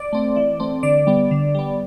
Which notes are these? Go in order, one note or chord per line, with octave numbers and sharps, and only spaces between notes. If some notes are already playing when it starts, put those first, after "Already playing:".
Already playing: D5
A3 C4
E3
A3 C4
D3 D5
G3 B3
D3
G3 B3